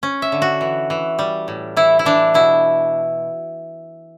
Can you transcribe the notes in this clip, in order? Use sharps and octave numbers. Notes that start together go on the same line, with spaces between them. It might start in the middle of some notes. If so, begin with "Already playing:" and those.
C#4
E5
D3
F#4
E3
E3
G3
A2
E3 E4
E4
E3 D4
B2 E4